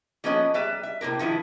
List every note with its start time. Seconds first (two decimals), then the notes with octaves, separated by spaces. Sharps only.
0.24 F3 A#3 B3 C#4 B4 D#5
0.54 G3 B4 E5 A#5
0.83 E5
1.01 A2 C3 A#3 A#4
1.19 D#3 F3 E4 B4